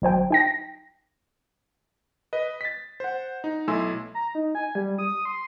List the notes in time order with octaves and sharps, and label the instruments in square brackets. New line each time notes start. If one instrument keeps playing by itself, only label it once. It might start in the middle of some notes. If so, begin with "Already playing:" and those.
[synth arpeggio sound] G1 F#3 C5 G5
D#4 G5 A#6
[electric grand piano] B4 D#5
A6 B6
C5 F#5
D#4
B1 A3 E4 G#5 C6 E6
[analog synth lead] A#5
D#4
G#5
G3
D#6
C6